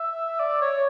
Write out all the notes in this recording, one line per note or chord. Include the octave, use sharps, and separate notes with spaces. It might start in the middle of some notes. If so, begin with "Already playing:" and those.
Already playing: E5
D5
C#5